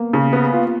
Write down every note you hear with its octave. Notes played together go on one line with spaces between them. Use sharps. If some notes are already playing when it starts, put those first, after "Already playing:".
Already playing: A#3 B3
C#3
B3
F4